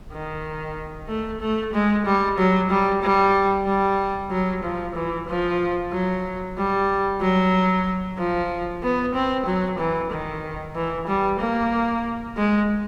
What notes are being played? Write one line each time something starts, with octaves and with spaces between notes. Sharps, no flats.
D#3
A3
A3
G#3
G3
F#3
G3
G3
G3
F#3
F3
E3
F3
F#3
G3
F#3
F3
B3
C4
F#3
E3
D#3
E3
G3
A#3
G#3